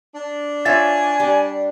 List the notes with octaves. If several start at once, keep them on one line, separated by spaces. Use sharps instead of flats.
D4
F4 C#5 E5 G#5 G#6 A6
G3